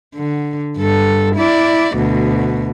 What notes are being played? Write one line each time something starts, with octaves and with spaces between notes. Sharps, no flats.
D3
G2 A4
E4 D5
D2 B2